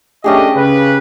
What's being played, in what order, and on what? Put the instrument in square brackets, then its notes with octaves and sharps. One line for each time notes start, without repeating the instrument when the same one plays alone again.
[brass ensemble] A3 D4 D#5 [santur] C#4 G4 G#4
[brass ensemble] C#3 B4